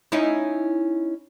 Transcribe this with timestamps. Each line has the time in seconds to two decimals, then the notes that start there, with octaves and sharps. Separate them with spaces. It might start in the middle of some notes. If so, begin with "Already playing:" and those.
0.12 C#4 D#4 E4